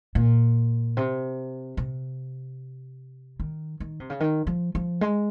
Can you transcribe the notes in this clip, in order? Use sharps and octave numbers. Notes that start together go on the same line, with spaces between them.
A#2
C3
C3
D#3
D#3
C3
C#3
D#3
F3
F3
G#3